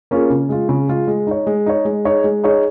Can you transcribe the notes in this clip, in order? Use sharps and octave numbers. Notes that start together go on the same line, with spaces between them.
A#3 C#4 F4 G#4
C#3
G#3 F4
C#3
G#3 F4
G#3
D#4 C#5
G#3
D#4 C#5
G#3
D#4 G#4 C#5
G#3
D#4 G#4 C#5